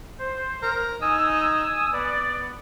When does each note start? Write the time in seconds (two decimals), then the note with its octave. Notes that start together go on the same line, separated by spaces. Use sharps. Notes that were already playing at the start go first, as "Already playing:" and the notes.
0.19 C5
0.63 A#4
1.02 D#4 G#5 D#6 E6
1.92 B3 D5